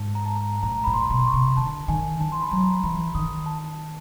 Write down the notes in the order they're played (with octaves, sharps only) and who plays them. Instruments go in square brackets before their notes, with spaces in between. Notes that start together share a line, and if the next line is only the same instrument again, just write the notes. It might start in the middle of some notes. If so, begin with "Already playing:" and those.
Already playing: [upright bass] G#2 [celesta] A5
[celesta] A#5
A5
A#5
[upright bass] A2 [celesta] A#5
[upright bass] A2 [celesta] B5
[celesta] C6
[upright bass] B2
[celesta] C6
C#6
[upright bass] C3
[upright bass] D3 [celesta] A5
[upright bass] D#3 [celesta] G#5
[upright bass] E3 [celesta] A5
[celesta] C6
B5
[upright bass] F#3 [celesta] A#5
[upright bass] E3 [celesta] B5
[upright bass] D#3 [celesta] D#6
[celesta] A5